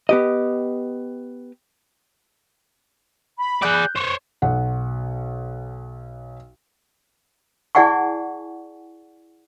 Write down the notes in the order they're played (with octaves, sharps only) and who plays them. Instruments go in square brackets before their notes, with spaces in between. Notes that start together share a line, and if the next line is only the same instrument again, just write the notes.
[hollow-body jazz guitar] B3 G4 D#5
[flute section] B5
[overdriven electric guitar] G#4 D5 [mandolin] F#6 G6
[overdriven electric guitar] C5 C#5 [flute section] C#6
[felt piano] B1 F#5
[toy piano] E4 G#4 D5 F#5 G#5 C#6